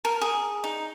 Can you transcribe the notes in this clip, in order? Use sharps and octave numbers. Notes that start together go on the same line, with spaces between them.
A#4
G#4
D#4